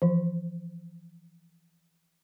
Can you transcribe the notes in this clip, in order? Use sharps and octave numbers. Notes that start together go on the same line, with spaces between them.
E3 F3